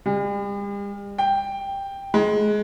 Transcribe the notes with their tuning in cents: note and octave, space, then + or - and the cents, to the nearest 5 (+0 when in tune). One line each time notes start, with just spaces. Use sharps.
G3 +45
G5 +5
G#3 +15